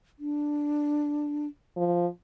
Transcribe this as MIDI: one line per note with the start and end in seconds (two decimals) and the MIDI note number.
0.19 1.47 62
1.77 2.06 53